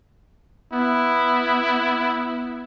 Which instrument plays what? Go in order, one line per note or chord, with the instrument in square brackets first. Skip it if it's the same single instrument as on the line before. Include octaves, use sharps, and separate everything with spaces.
[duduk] B3 [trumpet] E4